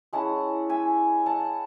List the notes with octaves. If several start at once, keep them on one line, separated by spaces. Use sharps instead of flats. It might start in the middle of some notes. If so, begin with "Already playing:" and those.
G#3 C#4 E4 F#5 A5
E5 G#5
F#5 A5